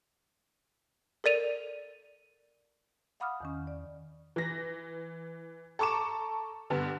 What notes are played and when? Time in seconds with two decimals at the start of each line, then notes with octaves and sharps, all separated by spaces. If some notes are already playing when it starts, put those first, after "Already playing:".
1.24 A4 A#4 D5 D#7 F7
3.20 F5 F#5 B5 D6 D#6 F6
3.41 E2 D#3 C#4
3.67 D5
4.36 E3 A#6
5.79 A4 A#5 C#6 D6 E7
6.70 G2 D3 B3